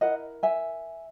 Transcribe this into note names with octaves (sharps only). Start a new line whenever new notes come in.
E4 A#4 D#5 F#5
E5 G#5